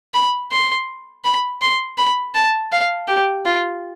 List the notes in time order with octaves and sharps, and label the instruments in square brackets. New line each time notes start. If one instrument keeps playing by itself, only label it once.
[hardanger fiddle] B5
C6
B5
C6
B5
A5
F5
G4
F4